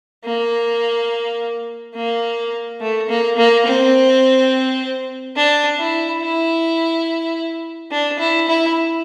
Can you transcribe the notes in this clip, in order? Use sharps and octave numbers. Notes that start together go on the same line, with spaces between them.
A#3
A#3
A3
A#3
A#3
C4
D4
E4
E4
D4
E4
E4